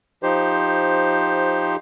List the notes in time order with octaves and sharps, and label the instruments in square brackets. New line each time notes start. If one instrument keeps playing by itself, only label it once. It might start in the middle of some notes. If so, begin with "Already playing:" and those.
[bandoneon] F3 D#4 G4 C5